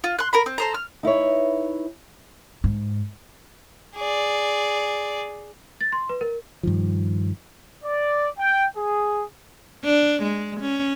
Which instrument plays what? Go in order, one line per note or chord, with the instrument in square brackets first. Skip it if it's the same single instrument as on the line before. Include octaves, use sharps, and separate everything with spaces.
[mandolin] F4
C6 F#6
A#4 A#5 B5
C4
A4 C5 A#5
F6
[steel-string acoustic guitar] D#4 E4 B4 C#5
[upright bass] G#2
[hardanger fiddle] G#4 D5
[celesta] A6
C6
B4
A#4
[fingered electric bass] G2 D#3 F3
[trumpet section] D5
G5
G#4
[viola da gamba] D4
G#3
C#4